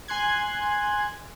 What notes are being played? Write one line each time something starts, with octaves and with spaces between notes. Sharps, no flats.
G#5 C6 F#6 G#6